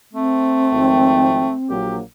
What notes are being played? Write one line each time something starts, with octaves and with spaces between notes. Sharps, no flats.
A3 C4
G#1 F3 G5
A#1 F#3 A#3 G4